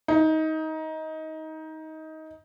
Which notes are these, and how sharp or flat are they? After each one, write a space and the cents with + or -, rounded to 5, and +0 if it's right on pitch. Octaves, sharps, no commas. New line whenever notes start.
D#4 +20